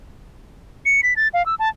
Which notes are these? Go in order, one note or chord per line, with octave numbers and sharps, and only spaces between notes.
C#7
B6
A6
F5
E6
A5